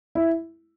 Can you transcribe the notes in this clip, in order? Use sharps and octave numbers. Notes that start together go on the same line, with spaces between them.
E4